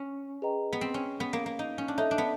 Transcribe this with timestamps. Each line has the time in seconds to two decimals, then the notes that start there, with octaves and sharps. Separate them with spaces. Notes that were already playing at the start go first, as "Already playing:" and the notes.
Already playing: C#4
0.42 G#4 B4 D#5 G5 A#5
0.73 B3
0.81 C4
0.94 C#4
1.20 B3
1.33 A#3
1.46 A#3
1.59 D#4
1.78 C#4
1.88 D4
1.98 D#4 A4 C#5 E5
2.11 D4
2.18 B3